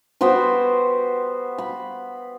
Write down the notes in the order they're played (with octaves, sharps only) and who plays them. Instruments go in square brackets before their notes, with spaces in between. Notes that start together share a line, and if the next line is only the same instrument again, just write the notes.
[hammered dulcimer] B3 F#4 G4 C5
B5